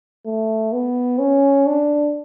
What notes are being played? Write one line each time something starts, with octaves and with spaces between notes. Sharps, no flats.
A3
B3
C#4
D4